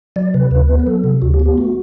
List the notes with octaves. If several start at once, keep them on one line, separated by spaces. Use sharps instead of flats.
F#3 D5
C3 B4
D2 B4
B3
B4
F#3 A4
C3
D2 F#4
G4
B3
G4
A3 F#4